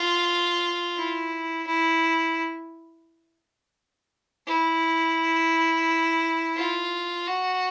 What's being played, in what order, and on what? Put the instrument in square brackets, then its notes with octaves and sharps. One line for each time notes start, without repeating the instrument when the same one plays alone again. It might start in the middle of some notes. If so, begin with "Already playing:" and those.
Already playing: [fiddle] F4
E4
E4
E4
F4
F#4